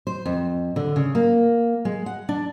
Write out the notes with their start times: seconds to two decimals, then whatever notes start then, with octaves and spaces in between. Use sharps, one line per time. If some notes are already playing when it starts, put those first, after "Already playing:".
0.07 C5
0.25 F2
0.76 D3
0.96 C#3
1.15 A#3
1.85 G#3
2.06 F#5
2.29 D4